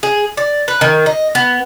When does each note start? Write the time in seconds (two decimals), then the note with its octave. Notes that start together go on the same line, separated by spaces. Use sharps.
0.03 G#4
0.37 D5
0.68 B4
0.81 D#3
1.06 D#5
1.35 B3